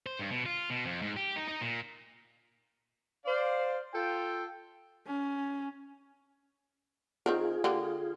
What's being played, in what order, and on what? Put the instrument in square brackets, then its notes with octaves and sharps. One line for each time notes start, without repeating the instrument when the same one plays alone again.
[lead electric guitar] C5
G2
B2
F4
B2
F2
G#2
G4
D#4
D#4
A#2
[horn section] C5 D5 F5
F4 A4 G5
[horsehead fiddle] C#4
[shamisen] D#3 C4 A#4 [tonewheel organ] F4 G#4
[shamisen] D3 A#3 G4